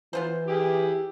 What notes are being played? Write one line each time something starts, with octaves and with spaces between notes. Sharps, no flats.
E3 B3 F4 C5
E4 G4 G#4